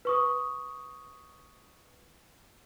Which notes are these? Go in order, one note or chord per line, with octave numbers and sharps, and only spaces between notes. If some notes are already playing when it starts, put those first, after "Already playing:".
B4 C#6 D#6